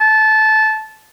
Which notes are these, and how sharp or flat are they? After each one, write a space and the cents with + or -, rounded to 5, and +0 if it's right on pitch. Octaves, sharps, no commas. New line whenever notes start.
A5 -20